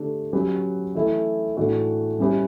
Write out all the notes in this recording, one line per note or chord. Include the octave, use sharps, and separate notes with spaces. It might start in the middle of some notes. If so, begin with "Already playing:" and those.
Already playing: D3 A3 D4 G4
F#3 C#4 G4 B4
E3 A3 E4
A2 E3 A3 D4 F#4
G3 C#4 E4 G4 B4